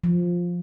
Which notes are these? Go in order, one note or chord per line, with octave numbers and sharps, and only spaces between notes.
F3